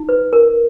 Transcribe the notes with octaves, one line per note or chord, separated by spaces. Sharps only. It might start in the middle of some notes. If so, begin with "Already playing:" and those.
Already playing: D#4
B4
A#4